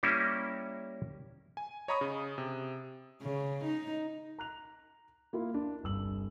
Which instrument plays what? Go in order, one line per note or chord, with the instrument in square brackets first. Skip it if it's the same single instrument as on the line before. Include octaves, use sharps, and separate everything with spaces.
[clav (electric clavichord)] G3 A#3 C#4 E4
[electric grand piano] G#5
C#5 D#5 A#5 B5 C#6 D#6
C#3
C3
[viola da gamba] C#3
D#4
[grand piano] A#5 F#6 F7
A#3 E4 F4
D4
G1 C2 E6 F#7